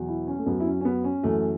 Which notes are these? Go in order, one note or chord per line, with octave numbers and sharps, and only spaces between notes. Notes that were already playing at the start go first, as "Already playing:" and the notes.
Already playing: E2 B2 F#3
E4
C#4
A3
F#2 F#3 B3
E4
C#4
C#4
B3
C#4
F#2 E3 A3